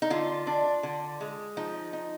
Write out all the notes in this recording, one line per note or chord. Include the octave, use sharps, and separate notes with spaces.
D#4
D3 F4
D4
D3
G#3
F3 D#4
D#4